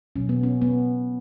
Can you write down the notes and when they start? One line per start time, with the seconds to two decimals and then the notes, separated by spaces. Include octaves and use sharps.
0.16 B2 F#3 A#3 C#4
0.29 B3
0.43 C#4
0.61 B3